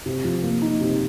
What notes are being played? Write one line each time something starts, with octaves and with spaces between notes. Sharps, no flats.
C3
F3
A#3
D#4
C3